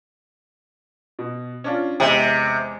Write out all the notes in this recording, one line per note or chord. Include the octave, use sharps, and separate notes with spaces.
B2
C#4 D4 F4
E2 C3 G#3 G5